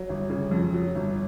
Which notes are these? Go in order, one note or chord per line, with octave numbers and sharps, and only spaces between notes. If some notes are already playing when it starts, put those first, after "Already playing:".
Already playing: F#3
G1
C#3
F2
F#3
G1